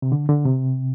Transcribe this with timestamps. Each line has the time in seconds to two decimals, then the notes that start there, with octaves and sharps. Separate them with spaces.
0.02 C3
0.12 D3
0.29 D3
0.45 C3